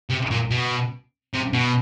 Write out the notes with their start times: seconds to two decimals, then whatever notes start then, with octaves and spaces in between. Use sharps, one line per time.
0.10 C3
0.31 A#2
0.51 B2
1.33 C3
1.53 B2